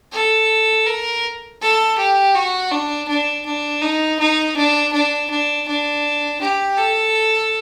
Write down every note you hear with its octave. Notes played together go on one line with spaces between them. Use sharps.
A4
A#4
A4
G4
F#4
D4
D4
D4
D#4
D#4
D4
D4
D4
D4
G4
A4